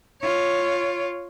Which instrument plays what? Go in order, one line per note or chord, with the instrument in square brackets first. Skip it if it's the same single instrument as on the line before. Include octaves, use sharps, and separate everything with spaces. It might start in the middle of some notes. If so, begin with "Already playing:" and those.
[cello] F4 C#5